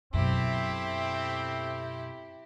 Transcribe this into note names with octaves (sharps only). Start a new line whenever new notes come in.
F#2 B2 A3 C4 E4 G4